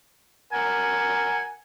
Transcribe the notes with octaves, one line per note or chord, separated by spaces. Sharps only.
A#4 F#5 G#5